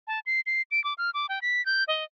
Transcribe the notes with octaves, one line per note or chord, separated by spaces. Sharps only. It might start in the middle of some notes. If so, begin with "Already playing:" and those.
A5
C7
C7
D7
D6
F6
D6
G5
B6
G6
D#5